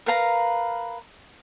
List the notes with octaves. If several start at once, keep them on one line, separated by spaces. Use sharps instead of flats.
A#4 B4 F5 A#5